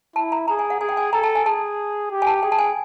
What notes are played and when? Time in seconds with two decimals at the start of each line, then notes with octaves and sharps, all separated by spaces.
0.16 E4 A5
0.32 A#5
0.48 G#4 A#5
0.59 G#5
0.70 F#5
0.81 G#4 G#5
0.89 G5
0.97 G#5
1.13 A4 A#5
1.23 A5
1.35 G#5
1.46 G#4 A5
2.10 G4
2.22 G#5
2.27 A5
2.43 G#4 G5
2.52 A5
2.59 G#5